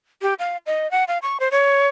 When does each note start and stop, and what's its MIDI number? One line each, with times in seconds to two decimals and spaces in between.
0.22 0.34 67
0.39 0.57 77
0.66 0.90 75
0.91 1.04 78
1.08 1.18 77
1.22 1.38 85
1.40 1.49 72
1.51 1.88 73